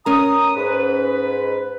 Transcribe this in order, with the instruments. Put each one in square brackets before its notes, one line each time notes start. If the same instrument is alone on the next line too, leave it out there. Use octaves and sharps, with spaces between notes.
[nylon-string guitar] C#4 A#4 [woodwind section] A#5 D#6
[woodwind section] G#2 B4